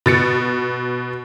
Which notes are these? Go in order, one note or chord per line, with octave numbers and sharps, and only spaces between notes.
B2 A6 C#7